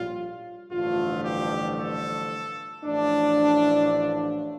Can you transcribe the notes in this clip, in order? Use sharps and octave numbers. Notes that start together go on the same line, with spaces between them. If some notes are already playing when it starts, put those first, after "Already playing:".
Already playing: A#1 A2 G3 F4
A1 G2 D3 F3 A3 F4
G4
A4
A1 A2 F3 A3 D4